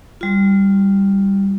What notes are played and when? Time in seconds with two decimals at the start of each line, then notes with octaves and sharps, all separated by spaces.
0.21 G3 F4